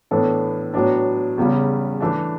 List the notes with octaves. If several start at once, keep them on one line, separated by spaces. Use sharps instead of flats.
A2 E3 B3 D4 A4
A2 F#3 B3 D4
E2 C#3 G3
E3 A3 D4